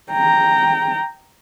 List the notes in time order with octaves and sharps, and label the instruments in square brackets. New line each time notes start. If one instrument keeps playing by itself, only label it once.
[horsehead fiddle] G5 A#5